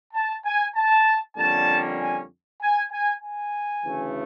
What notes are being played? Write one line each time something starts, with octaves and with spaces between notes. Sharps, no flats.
A5
G#5
A5
F2 D3 G3 A#3 C#4 A5
G#5
G#5
G#5
G#5
D2 C#3 E3 A3